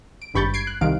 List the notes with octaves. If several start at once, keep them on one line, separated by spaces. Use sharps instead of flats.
D7
G#1 G2 B5 C#6 G6 A6
G#6 C7 D7
F#6
C2 D#3 F5 D7